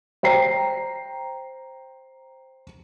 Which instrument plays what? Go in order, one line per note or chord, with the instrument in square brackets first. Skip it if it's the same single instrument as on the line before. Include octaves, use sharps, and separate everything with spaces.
[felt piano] C5 G5 A#5 C7